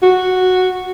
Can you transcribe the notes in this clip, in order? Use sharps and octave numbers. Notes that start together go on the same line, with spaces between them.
F#4